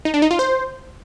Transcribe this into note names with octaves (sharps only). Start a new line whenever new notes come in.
D#4
D4
D#4
F4
C5